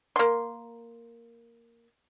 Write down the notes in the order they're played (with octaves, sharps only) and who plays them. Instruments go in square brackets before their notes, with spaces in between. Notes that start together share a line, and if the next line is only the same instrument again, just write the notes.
[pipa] A#3 C6